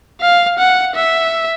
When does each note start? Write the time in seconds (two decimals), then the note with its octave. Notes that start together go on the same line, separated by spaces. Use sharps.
0.21 F5
0.59 F#5
0.96 E5